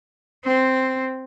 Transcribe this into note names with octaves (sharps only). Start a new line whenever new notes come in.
C4